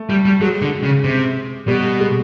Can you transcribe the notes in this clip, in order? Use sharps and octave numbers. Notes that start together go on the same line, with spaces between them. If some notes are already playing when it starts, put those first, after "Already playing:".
Already playing: A3
G3
G3
F#3 G#3
D3
C#3
C3
B2 G3
G3
G#3